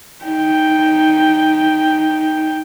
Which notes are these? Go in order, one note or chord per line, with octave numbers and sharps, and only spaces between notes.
D#4 G5